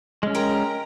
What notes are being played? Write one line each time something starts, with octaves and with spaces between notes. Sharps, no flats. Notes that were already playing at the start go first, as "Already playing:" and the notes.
G#3 C#4
A#4 G5 A#5